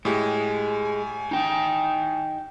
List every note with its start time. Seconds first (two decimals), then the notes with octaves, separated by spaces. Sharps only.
0.05 A2 G#3 G4 G#5
1.31 D#4 G5